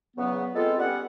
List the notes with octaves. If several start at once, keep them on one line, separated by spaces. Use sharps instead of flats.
E2 C#3 F#3 B3
G#3 B3 C4 F4 A4
G3 B3 C#4 F#5